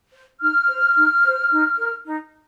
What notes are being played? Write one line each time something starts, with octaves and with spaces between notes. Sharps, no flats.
C5
D#4 F6
C5
D#4
C5
D#4
A#4
D#4